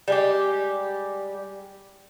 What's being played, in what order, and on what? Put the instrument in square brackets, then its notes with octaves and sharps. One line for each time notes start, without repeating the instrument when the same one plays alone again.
[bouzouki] G3 G#3 G4